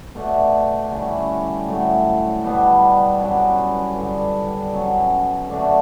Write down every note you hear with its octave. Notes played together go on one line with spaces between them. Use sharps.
B2 A3 D4
D3 G3 C#4 E4
A2 F#3 A3
B2 G3 B3 D4
G2 F#3 C#4 F#4
G2 D3 G3
B2 F#3 C#4
D3 A3 D4 F#4